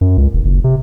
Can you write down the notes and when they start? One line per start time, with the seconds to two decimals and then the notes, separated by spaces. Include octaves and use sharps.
0.01 F#2
0.18 C#2
0.33 E1
0.45 F#1
0.64 C3